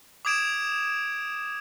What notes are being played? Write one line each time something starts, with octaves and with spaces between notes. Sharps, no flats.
D6 D#6 G#6 D7 E7